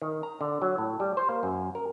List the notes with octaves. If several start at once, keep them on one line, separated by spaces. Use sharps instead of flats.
D#3
A#5
D3
F#3
A2
G3
C5
A#3
F#2
A#4